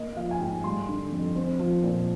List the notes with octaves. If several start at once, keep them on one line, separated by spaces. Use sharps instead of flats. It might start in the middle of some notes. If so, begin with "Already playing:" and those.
Already playing: A#3 D#5
F3 F5
G#5
G#2 G5
G3 C6
D3
F2
C4
F3
A#2